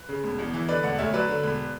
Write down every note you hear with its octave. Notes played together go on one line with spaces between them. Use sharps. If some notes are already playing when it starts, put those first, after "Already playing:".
Already playing: B4
C#3
E1
E2
E3
D3 B4 D5
E1 D5 F#5
D2 C#5 E5
F#3 B4 D5
D3
E1